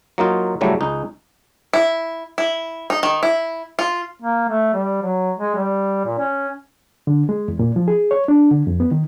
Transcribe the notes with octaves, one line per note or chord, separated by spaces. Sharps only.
F#3 A#3 D#4 F4
A2 C#3 F#3 G3 A3
C#2 D#4
E4
E4
D#4
D#3
E4
F4
A#3
A3
G3
F#3
G#3
G3
A#2
C#4
D3
G#3
E2
A#2
F3
G#4
C#5
D4
D3
F2
B3
D#3